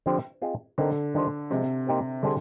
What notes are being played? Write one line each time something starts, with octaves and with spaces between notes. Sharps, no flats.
D3 F3 C4 G4 C5
C4 F4 G#4 C5 D#5
D3 C4 D#4 A#4
D#3 G3 D4 F4 C5
C3 F3 G#3 C4
A#3 D#4 G4 C5
D3 G3 D4 G#4 C5